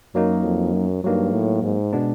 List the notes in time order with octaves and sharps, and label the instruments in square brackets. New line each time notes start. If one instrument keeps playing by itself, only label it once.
[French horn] F#2 [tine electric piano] F#3 A#3 D#4
[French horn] F2
F#2
[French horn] G2 [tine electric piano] F#3 A#3 D#4
[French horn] A2
G#2
[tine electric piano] B2 G#3 B3 D4